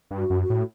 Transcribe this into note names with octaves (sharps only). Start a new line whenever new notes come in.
G2
F#4
F#2
F#4
A2